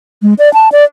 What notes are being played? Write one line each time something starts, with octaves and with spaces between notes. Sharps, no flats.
G#3
D5
A5
D5